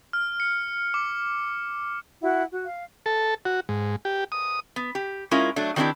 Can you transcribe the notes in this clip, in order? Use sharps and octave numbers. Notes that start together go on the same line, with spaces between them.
F6
C#7
D6
E4 F#4 F#5
F#4
F5
A4
F#4
G#2
G4
D#6
B3
G4
G#3 C#4 E4 F4 A#4
F#3 A3 D4
D#3 F#3 C4 D4 E4 G4